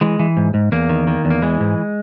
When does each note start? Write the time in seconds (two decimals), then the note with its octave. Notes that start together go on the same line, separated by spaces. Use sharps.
0.01 E3 G#3
0.19 E3
0.37 G#2
0.54 G#2
0.72 E2 A#3
0.89 D#3
1.07 D#3
1.25 E2
1.30 A#3
1.42 E3 G#3
1.60 G#2